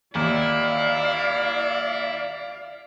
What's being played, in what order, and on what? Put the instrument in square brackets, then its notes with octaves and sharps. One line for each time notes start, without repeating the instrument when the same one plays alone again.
[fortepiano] D#2 [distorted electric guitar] E4 [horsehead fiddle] D5 F5